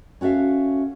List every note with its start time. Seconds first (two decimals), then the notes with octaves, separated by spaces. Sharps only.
0.21 C#4 F#4 A4 E5 F5